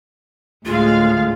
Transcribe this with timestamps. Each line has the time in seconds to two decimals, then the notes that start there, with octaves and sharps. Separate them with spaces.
0.66 D2 A2 G#3 F4 F5